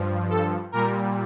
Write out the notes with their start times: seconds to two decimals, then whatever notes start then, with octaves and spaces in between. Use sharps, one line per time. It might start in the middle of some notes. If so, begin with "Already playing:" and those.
Already playing: G2 F3
0.30 A4
0.72 A#2 G3 A#4